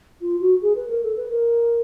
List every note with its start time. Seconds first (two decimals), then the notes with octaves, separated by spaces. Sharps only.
0.21 F4
0.41 F#4
0.62 G#4
0.75 B4
0.89 A#4
1.03 A4
1.16 B4
1.30 A#4